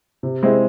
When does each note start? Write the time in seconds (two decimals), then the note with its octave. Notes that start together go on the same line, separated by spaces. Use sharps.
0.23 C3
0.43 G#3 C4 E4